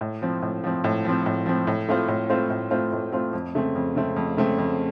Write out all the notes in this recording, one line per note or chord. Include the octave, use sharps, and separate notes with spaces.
A2
F3 C4
A2
F3 C4
A2
F3 C4
A2
F3 C4
A2
A3 C4 F4 C5
A2
A3 C4 F4 C5
A2
A3 C4 F4 C5
A2
A3 C4 F4 C5
F2
C#3 A3 C4
F2
C#3 A3 C4
F2
C#3 A3 C4
F2